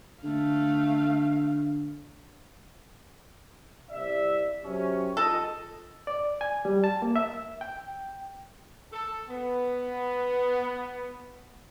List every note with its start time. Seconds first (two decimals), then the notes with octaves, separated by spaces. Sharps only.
0.23 D3 A3 F5
3.90 C2 D5 E5
4.63 F#2 C3 C#4
5.17 F4 G#4 A4 D#5
6.07 D5
6.41 G#5
6.65 G3
6.84 A5
7.02 A#3
7.16 E5
7.61 G5
8.92 A4
9.28 B3